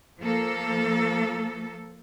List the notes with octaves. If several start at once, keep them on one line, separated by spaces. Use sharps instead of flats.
F3 A#3 A4